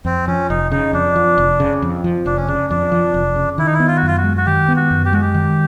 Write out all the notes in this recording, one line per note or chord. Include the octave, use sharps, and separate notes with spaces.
F2 C4
F3 C#4
F1 D#4
C#3 D#4
F2 D4
F3
F1
C#3
F2
F3
F1 D4
C#4
C#3 D4
F2 D4
F3
F1
C#3
D#3 E4
D#4
E4
B3
F4
F#4
F#2 F4
F#4
G#3
F#4
D#3 G4
B3
F#4
F#2
G4
G#3 F#4
G4
D#3